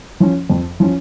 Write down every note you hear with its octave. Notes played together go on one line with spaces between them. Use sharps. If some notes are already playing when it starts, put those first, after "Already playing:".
F3 C#4
F2
F3 C#4